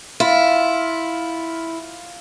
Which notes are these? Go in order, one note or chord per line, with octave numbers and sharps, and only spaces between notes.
E4 F4